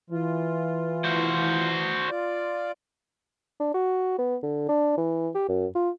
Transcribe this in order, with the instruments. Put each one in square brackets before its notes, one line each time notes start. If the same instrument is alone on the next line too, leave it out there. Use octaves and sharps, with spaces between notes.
[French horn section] E3 [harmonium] F4
[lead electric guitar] F#4 C5
[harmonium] F4 D5
[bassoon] D4
F#4
B3
D3
D4
E3
G4
F#2
F4